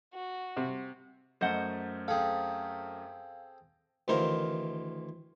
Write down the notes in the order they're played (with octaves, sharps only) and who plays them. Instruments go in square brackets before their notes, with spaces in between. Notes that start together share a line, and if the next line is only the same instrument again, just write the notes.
[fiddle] F#4
[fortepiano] C3
[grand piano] F#2 A3 G6 [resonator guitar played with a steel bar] C5 D#5 F#5
[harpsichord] C4 G#4 A4 [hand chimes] F5
[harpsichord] D2 D#3 E3 A#4 C5 F5